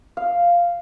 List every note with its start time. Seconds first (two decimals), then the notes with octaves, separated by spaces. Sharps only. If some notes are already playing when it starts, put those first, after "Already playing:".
0.17 F5